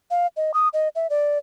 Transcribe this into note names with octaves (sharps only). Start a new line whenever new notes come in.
F5
D#5
D#6
D#5
E5
D5